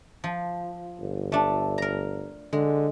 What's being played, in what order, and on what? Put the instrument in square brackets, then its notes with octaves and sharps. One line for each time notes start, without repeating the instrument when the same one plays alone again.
[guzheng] F3
[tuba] G1
[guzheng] A3 D4
A#4 A#5
[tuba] D3 [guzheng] G#3